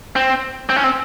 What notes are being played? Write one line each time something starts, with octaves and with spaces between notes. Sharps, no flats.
C4
C4
C#4
C4